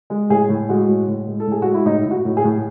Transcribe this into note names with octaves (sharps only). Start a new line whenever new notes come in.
G#3
A2 G#4
A2
G#3 F#4
A2
A2
G#3
A4
A2 G#4
G#3 F#4
E4
A2 D#4
A2
F#4
A2
G#4
A2